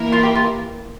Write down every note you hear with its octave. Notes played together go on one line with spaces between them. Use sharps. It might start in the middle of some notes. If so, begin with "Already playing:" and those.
Already playing: E3 A#3 E4 A#4
F4
G4
F4